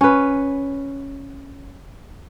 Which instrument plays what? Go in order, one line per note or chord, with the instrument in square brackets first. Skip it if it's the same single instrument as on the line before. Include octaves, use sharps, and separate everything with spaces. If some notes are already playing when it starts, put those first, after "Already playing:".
[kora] C#4 B4